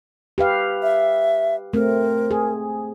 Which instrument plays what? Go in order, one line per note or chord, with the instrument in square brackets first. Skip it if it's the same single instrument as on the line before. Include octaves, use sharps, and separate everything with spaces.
[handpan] G4 B4 F5
[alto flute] E5
[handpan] A3 C4 [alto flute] A#4
[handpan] G#4